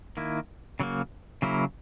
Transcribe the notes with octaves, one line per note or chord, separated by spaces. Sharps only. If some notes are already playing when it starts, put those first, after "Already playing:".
D#3 A#3 E4
C#3 F#3 A#3
C#3 F#3 A#3 E4